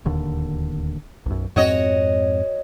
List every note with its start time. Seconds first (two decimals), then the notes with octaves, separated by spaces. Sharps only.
0.05 D1 D#2 D3
1.26 B1 F#2
1.56 F2 G#2 C4 F#4 C#5 D#5